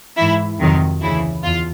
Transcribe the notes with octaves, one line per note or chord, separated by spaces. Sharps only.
G#2 E3 E4
F2 C3 D#3 F#3
D2 C#3 E3 E4
E2 F4